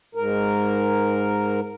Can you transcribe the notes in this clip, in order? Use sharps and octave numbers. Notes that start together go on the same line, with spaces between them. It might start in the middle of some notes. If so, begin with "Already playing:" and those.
G#2 A#4